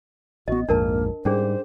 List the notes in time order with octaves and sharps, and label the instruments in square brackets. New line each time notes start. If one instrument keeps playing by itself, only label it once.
[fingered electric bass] A1 B3 [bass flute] F#4 [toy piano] D#5
[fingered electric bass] A#1 F2 G#2 [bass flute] A#3 [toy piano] D4 A#4 A5
[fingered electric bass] G#2 G3 [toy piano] C#4 D4 G#4 [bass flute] C5